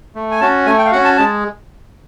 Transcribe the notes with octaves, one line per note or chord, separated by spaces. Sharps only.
A3
G#5
C#4 F#4 A5
A3 G#5
G5
F5
C#4 F#4 F#5
A5
G#3 A5